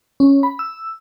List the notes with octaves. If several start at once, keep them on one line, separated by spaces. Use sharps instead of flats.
C#4
B5
E6